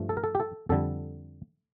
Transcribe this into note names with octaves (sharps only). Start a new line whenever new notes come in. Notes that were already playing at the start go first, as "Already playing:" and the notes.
Already playing: G2 F3 A3
A4
A#4
A4
G4
A4
F2 D3 G3 A4